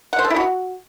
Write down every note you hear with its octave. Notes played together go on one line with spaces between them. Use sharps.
F#5
C5
A4
E4
F#4